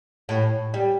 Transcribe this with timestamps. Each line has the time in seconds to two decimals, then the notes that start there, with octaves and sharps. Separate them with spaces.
0.29 A2
0.74 G3